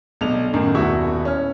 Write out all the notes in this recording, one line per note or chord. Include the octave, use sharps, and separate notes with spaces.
B1 D3 F7
F#2 A2 D#3
D#1 B2 E4 F#4 C#6
C#4 F6